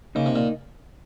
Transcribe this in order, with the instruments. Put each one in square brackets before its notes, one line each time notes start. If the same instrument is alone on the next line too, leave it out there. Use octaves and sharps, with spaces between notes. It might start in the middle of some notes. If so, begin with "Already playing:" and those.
[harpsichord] C#3 [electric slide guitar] A#3 D#4 A#4 D#5
[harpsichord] C3
A#2